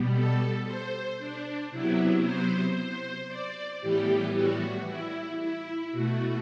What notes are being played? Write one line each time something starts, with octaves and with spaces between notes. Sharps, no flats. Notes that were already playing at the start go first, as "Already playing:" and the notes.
Already playing: B2 G3 B3
A4
C5
D4
C3 F#3 B3 E4
C5
C5
D5
A2 E3 G3 B3 G4
F#4
E4
E4
B2 A3 F#4